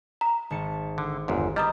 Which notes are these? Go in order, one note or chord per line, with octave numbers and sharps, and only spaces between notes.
A#5
G#1 A5 C#7
D3
G1 E2 G#2
G3 D#5 A#5 D#6